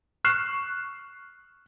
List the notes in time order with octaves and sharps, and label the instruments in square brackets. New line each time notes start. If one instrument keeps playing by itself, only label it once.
[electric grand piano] C#6 F6 F#6 C7 E7